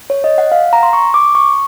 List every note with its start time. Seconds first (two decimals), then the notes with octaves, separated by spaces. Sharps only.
0.10 C#5
0.24 D#5
0.38 F#5
0.52 F5
0.73 A#5
0.83 C6
0.93 C#6
1.14 D6
1.35 C#6